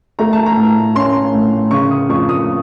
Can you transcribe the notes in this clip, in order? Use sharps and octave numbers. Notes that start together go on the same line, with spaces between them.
A3 A#5
A5
A#5
A2
C#4 C6
A2
C#3 C#6
D#6
F2 C#6
D#6